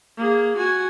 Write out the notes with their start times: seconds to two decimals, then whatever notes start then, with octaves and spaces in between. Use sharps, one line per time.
0.17 A#3 G#4
0.57 F#4 G#5